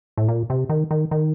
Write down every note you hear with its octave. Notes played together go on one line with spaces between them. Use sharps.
A2
A#2
C3
D#3
D#3
D#3